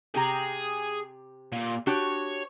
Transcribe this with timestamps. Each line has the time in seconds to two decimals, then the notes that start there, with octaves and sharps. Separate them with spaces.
0.15 C3 G4 G#4 A#5
1.52 A#2
1.87 D4 F#4 G4 C#5